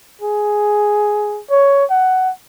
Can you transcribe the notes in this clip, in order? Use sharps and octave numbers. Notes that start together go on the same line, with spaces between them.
G#4
C#5
F#5